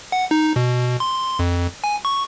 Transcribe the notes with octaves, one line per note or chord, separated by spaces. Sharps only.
F#5
D#4
B2
C6
F2
G#5
C#6